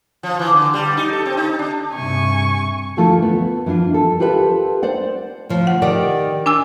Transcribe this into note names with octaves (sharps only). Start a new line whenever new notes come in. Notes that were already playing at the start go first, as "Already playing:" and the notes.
F3
E3
D3
G3
D#4
A4
C4
D#4
D4
G2 C3 G#5 C#6
D2 E3 F3 A3 F4 A4
B3
E3 F3 D4 F4
A4
F4 G4 A4 B4 D#5 E5
C5 D5 F#5
D2 F3
F#5
D#3 G4 D5
D4 G#5 E6